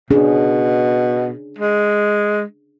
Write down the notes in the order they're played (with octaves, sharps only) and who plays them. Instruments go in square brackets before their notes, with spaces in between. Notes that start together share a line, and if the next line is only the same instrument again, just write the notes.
[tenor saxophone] B2 [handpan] C#4 D4 G#4
[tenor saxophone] G#3